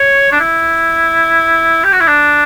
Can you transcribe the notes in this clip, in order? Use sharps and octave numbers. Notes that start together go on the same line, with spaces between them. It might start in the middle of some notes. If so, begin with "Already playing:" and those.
Already playing: C#5
D4
E4
G4
F#4
E4
D4